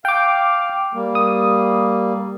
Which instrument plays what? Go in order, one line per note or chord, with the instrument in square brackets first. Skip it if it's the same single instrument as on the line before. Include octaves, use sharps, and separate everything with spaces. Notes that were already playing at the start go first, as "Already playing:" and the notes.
[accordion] F5 F6 [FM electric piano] G5 D6
[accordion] G3 A#3
[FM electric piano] D#6